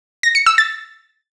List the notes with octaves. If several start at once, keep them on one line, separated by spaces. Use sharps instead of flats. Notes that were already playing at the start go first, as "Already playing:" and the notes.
A#6
C#7
E6
A6